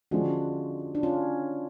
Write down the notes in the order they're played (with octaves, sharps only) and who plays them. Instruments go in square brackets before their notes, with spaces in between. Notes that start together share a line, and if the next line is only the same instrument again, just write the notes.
[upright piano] D3 F3 G#3 C#4 F4 [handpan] D4 F#4
[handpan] D4
C#4 F4